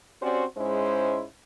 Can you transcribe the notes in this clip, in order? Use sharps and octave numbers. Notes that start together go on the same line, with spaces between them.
C4 C#4 F#4 G4 C5 D5
G#2 G#3 C#4 E4 C5